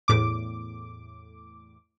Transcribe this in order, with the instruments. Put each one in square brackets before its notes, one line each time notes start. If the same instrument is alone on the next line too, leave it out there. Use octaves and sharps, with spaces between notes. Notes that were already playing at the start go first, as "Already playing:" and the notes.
[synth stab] E2 A2 D6